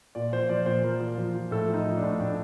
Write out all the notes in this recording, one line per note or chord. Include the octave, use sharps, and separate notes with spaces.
A#2 D5
F3 C5
F3 D5
A#2 C5
F3 A#4
F3
F3
F3
A2 A4
F3
D#4
F3
D4
A2
A2 D4